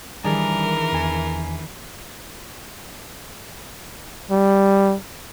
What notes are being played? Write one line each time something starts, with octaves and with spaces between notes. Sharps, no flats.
D#3 E3 G3 D4 G#4 A#4
E2 G#5
G3